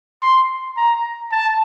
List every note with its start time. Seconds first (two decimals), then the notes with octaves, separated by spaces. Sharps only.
0.22 C6
0.77 A#5
1.31 A5